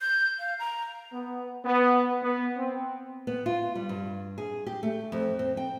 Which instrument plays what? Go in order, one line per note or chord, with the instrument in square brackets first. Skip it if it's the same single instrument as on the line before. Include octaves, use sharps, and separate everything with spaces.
[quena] G6
F5
A#5
[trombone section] B3
B3
B3
C4
[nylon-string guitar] B3
F4
G3
G2
G#4
G4
A3
F2
C4
G5